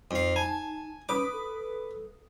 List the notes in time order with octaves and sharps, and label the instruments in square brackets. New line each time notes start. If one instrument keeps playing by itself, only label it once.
[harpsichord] F2 F5 [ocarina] D#4
[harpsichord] G#5 [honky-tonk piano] A5
[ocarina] C#4 [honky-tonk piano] B4 D#6 [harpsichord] D6
[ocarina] A4